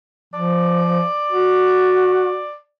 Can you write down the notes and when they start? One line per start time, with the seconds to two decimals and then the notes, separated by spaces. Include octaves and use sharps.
0.34 F3 D5
1.32 F#4